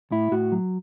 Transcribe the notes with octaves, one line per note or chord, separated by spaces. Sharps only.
A2 E4
A2 F#4
F#3